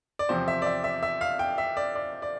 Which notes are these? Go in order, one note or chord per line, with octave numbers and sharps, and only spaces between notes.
D5
E2 C3 F3 C4 C5
E5
D5
E5
E5
E5
F5
G5
E5
D5
D5
D5